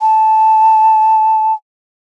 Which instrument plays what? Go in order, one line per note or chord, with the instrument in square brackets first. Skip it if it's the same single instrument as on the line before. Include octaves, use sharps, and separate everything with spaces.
[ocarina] A5